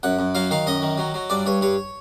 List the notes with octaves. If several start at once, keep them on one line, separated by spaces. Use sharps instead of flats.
F#2 F#5
F#2
F#3 F5
D#3 F5
F#2 D#5
D#3
F#3
F#3
G2 D5
G2 C#5
G2 C#5